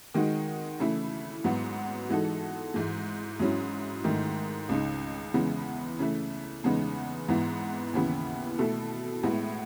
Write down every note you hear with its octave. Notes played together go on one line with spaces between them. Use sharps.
D#3 G#3 D#4 F#4
C#3 E3 A3 E4
G#2 F#3 B3 F#4
E3 G#3 D#4 F#4 A4
G#2 E3 G#3
G#2 F#3 C#4 E4
G#2 D#3 A3 D#4
C#2 C#3 G#3 D#4
E2 C#3 G#3 B3 E4
C#3 E3 A3
E2 C#3 G#3 B3 D#4
G#2 E3 B3 E4
D#2 C#3 E3 B3 E4
B2 A3 E4 A4
A2 G#3 B3 E4